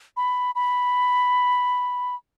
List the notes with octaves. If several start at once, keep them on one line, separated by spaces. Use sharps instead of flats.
B5
B5